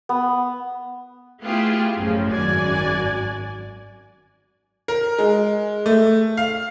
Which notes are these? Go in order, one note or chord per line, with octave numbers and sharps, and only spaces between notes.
B3
A3 B3 E4 F4 G4 G#4
A1 F#2 A2 C#3 F3
G#1 F#2 F#4 D5 G#5
A#4
G#3
A3
F5